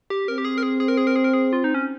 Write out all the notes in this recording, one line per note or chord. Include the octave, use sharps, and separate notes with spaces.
G4
C4 A#4
G4
G#4
A#4
G#4
G#4
A#4
G#4
A#4
G#4
A#4
G#4
F4
D#4
C#4